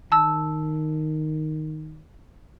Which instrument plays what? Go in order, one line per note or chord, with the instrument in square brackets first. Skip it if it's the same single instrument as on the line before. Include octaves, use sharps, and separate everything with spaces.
[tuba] D#3 [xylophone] A5 E6